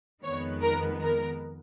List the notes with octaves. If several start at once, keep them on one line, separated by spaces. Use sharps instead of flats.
F2 D#3 G#3 B3 C#5
A#4
A#4